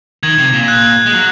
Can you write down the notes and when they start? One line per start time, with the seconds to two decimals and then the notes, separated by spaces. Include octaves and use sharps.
0.23 D#3 G#6
0.38 C3
0.53 A#2
0.68 F#6
1.06 G#3
1.12 F#3